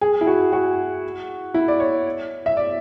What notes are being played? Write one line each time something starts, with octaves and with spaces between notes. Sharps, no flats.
G#4
E4
F#4
F#4
E4
D5
C#5
E5
D5